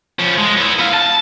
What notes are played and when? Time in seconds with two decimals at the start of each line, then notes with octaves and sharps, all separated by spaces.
0.19 F3 C#4
0.38 G#3
0.57 B3 E4
0.79 B3 F5
0.94 A5